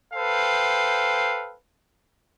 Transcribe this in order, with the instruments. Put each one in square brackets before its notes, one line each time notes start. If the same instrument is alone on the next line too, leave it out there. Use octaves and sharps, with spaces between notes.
[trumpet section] A4 B4 C5 F5 G5